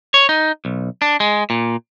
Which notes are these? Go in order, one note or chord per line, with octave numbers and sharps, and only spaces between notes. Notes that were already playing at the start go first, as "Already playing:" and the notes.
C#5
D#4
B1
D4
G#3
A#2